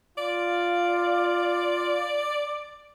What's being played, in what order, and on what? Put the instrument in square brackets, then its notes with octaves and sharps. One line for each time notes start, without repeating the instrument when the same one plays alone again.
[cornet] F4 [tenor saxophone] D5